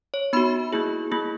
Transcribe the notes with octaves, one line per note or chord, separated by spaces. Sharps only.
C#5
B3 D#4 F#4 B5
A#3 E4 G#4
A#3 E4 G#4